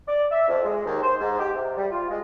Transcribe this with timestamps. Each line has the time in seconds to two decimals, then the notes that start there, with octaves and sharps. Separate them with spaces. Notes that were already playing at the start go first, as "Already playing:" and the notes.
0.08 D5
0.31 E5
0.48 F2
0.64 G#3
0.86 D#2
1.02 C5
1.20 G#2
1.39 G4
1.54 C3
1.77 G3
1.91 F4
2.10 G#3